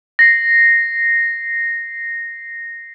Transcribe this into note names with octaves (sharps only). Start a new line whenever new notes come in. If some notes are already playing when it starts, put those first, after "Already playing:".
A#6 C7